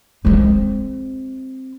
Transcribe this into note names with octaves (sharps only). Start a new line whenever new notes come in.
G#3 C4